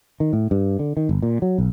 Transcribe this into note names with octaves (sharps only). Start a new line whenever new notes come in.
D#3
A2
G2
D3
D#3
G1
A#2
F#3
B1